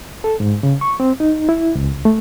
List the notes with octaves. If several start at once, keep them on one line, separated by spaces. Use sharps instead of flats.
A4
G#2
C#3
C#6
C4
D#4
E4
C#2
A3